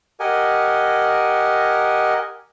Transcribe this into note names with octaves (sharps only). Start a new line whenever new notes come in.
G4 A#4 D#5 F#5 G#5